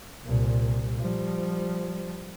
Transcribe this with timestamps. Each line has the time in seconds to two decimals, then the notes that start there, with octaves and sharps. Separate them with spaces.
0.23 C2 A#2
0.98 F3 G3